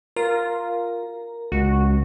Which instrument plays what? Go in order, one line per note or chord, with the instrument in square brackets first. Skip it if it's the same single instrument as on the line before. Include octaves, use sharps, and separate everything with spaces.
[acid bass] F4 [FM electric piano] A#4 A#5
[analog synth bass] C#2 [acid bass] F#4